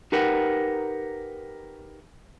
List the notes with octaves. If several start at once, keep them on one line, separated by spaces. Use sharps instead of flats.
D#4 G4 A#4 B4 F#5